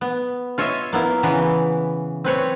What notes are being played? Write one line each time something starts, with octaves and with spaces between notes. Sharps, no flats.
B3
F4 C#5 D#5 E5
A#3 B3 E4
C#3 E3 B3
C4 B4 C#5